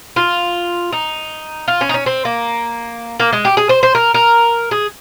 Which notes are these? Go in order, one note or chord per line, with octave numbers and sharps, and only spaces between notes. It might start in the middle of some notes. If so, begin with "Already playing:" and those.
F4
D#4
F4
C#4
D#4
C#4
C4
A#3
A#3
G#3
G4
G#4
C5
C5
A#4
A#4
G#4